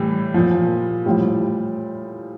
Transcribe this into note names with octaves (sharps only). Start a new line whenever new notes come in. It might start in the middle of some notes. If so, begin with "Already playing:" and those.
Already playing: A2 E3 G3
A#2 F3
A2 F3 G3